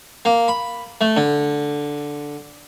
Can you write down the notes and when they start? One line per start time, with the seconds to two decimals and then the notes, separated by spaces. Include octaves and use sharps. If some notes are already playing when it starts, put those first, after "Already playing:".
0.25 A#3
0.48 B5
1.01 A3
1.17 D3